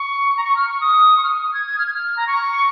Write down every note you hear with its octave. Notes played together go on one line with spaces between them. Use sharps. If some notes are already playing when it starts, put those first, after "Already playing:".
Already playing: C#6
A#5
C#6
F6
C#6
D#6
C#6
F6
D#6
D#6
G#6
G#6
F6
G#6
F6
A#5
C#6